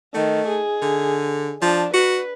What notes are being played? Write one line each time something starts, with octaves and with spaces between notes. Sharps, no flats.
D#3 A3
G#4
D3
F3 D4
F#4 B4